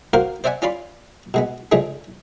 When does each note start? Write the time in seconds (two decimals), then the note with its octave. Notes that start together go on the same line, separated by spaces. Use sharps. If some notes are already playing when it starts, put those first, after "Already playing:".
0.14 A#3 F#4 A#4 C5 F5
0.44 C5 D5 E5 F#5 G#5
0.62 C#4 F4 D5 B5 C6
1.34 B2 G#3 B3
1.72 C#3 F3 G#3 A3 D4